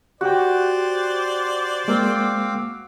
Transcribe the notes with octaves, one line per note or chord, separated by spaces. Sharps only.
F#4 G4 C5 D5 G5
G#3 A#3 C4 F5 D6